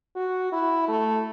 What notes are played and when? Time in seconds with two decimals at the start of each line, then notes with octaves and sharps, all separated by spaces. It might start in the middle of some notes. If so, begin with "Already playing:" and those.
0.16 F#4
0.52 E4
0.88 A3